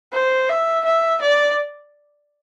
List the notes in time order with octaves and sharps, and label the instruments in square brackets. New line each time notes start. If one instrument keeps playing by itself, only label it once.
[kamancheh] C5
E5
E5
D5